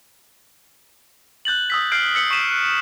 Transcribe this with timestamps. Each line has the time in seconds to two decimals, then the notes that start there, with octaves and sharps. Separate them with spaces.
1.45 F#6 G6 A6 F#7
1.70 D#6 E6 B6
1.92 F6 G6 C7 D7
2.15 E6 B6 C#7 F#7
2.30 C#6 E6 B6 D#7 E7
2.52 F#6